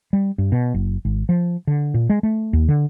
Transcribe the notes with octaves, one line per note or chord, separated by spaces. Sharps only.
G3
G2
B2
F#1
G#1
F3
D3
A#2
G#3
A3
D#2
D3